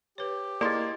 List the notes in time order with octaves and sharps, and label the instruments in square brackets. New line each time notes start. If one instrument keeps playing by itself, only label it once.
[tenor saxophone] G4 [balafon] B4 C#5
[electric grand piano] A#3 C6 [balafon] E4 G#4 [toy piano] D5 D#5